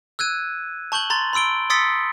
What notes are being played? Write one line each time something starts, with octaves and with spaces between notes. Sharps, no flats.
E6 F#6 G#6 D#7
A5 C#6 G6 F#7 G7
A#5 C6 A6
B5 C6 E6 D7 G7
C6 D#6 E6 A6 B6 C#7